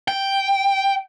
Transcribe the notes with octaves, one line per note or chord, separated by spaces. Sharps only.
G5